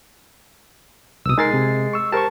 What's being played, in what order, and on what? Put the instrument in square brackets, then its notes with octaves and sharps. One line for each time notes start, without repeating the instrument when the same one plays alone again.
[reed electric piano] C2 B2 [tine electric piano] D#6 E6
[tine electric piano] G#3 A6 C7 [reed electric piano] D#4 G#4 A#4
[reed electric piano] C3
C#6 E6
[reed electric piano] G4 A#4 C5 [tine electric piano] A5 C#6